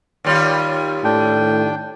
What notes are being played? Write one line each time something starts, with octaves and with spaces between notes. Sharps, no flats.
D#2 G3 F4
A2 D4 G5